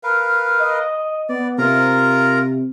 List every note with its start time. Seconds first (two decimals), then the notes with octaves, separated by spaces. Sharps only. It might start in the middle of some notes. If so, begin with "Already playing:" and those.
0.03 A#4 B4 F5
0.59 D#5
1.29 B3 D5
1.58 C3 F4 A#4 A#5